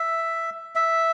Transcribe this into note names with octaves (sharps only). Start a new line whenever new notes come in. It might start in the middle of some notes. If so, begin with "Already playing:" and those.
Already playing: E5
E5